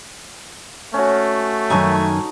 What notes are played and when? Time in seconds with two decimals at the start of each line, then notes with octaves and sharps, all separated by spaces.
0.94 A3 C#4 F#4
1.70 F#2 D#3 D#4 A4 G#5 C#6